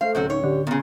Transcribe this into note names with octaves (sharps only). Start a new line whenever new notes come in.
A3 A4 C5 F5
D1 C3 F#3 C#4 F#4 G6
D#4 C#5
D3 G4
A#2 C#3 B3